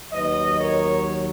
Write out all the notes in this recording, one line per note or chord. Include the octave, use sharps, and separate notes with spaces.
D#2 D#3 F#3 B4 D#5
A#4 C#5